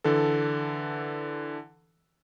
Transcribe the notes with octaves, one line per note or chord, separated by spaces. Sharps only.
D3 E3 A4